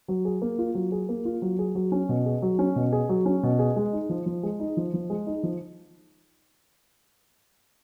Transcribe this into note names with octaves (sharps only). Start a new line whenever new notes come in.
F#3
G#4
A#3
F4
F#3
G#4
A#3
F4
F#3
G#4
F#3
C#4
B2
G#4
F#3
C#4
B2
G#4
F#3
C#4
B2
G#4
G#3
D#4
F3
F3
G#3
D#4
F3
F3
G#3
D#4
F3